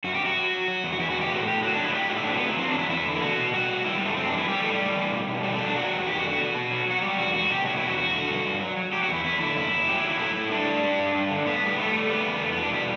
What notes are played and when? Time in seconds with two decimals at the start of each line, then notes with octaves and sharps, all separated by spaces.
0.04 F#2 F#4
0.15 G4
0.20 F#2
0.25 F#4
0.36 F#3
0.52 F#3
0.68 F#3
0.84 E2
0.93 F#4
1.00 E2 E4
1.10 B2 F#4
1.21 G4
1.31 A2 F#4
1.47 A2 G4
1.63 F#3 F#4
1.73 D4
1.79 F#3
1.84 E4
1.95 A2 G4
2.09 A2 F#4
2.16 E4
2.23 D4
2.26 F#3 C4
2.37 F#3 B3
2.48 E4
2.58 F#3 C4
2.68 D4
2.74 E2
2.79 E4
2.89 E2 E4
3.06 D3
3.11 E4
3.21 B2 F#4
3.37 B2
3.53 G3 F#4
3.69 G3
3.85 G3 E4
3.95 G3
4.01 F#2
4.06 A3
4.17 F#2 C4
4.27 D4
4.33 E3
4.38 E4
4.48 G3 G4
4.59 A2 A3
4.70 G3
4.80 A2
4.96 E3
5.12 B2
5.28 B2
5.43 F#3 G3
5.54 A3
5.59 F#3
5.65 D4
5.75 G3 F#4
5.91 E2
6.07 E2 G4
6.18 F#4
6.23 D3
6.28 F#4
6.38 B2
6.54 B2
6.71 F#3
6.86 F#3 F#4
7.02 G3 G4
7.18 E2 F#4
7.34 E2 F#4
7.50 B2 G4
7.65 F#3 F#4
7.76 E4
7.81 E2
7.87 F#4
7.97 E2 F#4
8.14 D3
8.29 G2
8.45 G2
8.61 F#3
8.77 F#3
8.93 F#3 G4
9.03 F#4
9.09 E2 E4
9.24 E2 E4
9.40 D3 E4
9.56 F#2 E4
9.72 F#2
9.88 F#3 G4
9.99 E4
10.04 F#3
10.09 E4
10.19 A2 E4
10.35 A2
10.51 G3 D4
10.67 G3
10.83 G3
10.99 G2
11.14 G2
11.31 D3
11.46 A2 B3
11.62 A2 G3
11.78 G3 A3
11.94 G3
12.10 G3 B3
12.26 E2
12.41 E2 A3
12.52 B3
12.58 B2
12.63 D4
12.73 G3 E4